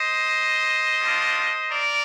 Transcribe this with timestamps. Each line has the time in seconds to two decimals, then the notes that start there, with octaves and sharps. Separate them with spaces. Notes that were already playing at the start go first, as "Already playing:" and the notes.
Already playing: C5 D#5
1.00 G3 D4 F4
1.70 A#4 D5